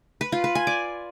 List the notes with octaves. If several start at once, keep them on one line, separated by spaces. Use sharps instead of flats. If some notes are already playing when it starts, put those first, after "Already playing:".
B4
F4
B4
G#5
D5